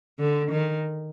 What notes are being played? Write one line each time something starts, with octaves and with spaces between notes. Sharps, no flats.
D3
D#3